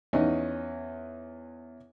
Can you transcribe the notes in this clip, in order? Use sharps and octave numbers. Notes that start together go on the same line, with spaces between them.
E2 C#4 D#4